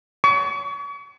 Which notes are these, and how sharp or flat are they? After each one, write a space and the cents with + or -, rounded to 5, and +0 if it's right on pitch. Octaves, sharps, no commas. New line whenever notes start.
C#6 +40